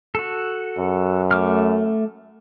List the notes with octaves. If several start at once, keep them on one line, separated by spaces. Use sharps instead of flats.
F#4 A4
F#2
A3 D6 F6